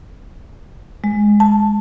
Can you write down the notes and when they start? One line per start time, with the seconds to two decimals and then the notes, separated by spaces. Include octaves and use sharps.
1.04 G#3
1.40 A5